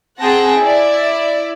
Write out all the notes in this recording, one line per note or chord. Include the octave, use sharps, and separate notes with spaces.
C4 G#4 F#5 G5 A5 A#6
E4 D5